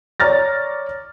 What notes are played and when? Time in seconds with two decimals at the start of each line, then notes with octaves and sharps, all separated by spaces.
0.20 C#5 D5 A#5 F6 A6 A#6